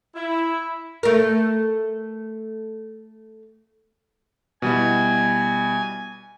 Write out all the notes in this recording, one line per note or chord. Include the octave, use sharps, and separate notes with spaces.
E4
A3 A#4
B2 G3 E4 G#5